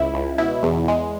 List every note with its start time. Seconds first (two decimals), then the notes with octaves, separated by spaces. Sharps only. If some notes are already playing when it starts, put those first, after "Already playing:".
Already playing: C#2 E4
0.14 C#2
0.38 B2 E4
0.63 E2
0.88 G#3